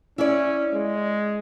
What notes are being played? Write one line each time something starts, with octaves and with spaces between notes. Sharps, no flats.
C#4 E4 D5
G#3